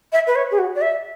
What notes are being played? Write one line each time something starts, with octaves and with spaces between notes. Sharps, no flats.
E5
B4
C#5
G#4
F#4
D5
E5